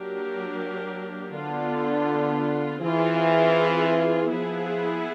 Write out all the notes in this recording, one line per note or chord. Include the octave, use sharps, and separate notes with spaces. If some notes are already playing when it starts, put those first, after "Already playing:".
Already playing: F#3 A#3 D4 G4 A#4
D3 B3 D4 F4
E3 C4 F4 G#4
F3 B3 E4 G#4